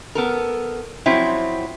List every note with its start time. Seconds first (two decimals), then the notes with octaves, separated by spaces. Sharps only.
0.15 B3 A4 A#4
1.06 F3 F#3 C4 E4